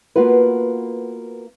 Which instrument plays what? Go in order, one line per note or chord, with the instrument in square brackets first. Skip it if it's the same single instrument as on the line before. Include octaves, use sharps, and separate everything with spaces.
[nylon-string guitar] A#3 B3 F4 F#4 B4